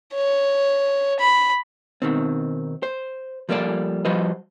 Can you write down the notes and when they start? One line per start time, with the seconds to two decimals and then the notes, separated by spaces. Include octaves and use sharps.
0.14 C#5
1.20 B5
2.02 B2 D#3 C4
2.83 C5
3.49 F3 G3 A#3 A4 D5
4.05 F3 G3 F#4 B4 C5 D#5